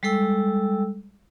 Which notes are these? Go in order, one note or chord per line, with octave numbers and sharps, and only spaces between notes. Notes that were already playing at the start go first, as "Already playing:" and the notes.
G3 G#3 A4 G5 E6